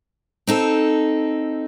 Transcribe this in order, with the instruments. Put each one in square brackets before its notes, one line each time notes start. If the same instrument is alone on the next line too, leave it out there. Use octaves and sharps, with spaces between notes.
[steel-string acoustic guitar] C4 D#4 A4